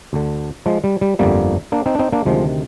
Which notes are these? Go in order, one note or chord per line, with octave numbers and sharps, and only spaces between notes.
D2 D3
F3 G#3
G3
G3
G1 F2 D3 G3 A#3
A#3 D4
C4 D#4
D4
C4 D#4
A#3 D4
D2 C3 D#3 F3 G#3